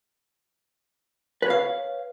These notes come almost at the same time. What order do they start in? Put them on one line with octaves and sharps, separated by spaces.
B4 C#5 F5